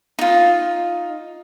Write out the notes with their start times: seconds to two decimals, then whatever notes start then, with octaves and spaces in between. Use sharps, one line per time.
0.19 D#4 F4